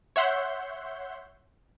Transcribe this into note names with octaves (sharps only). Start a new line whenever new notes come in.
C#5 E5 F#5 C6 G6